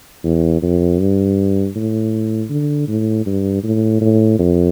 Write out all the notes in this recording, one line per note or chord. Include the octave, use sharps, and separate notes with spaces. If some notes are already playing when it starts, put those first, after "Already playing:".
E2
F2
G2
A2
D3
A2
G2
A2
A2
F2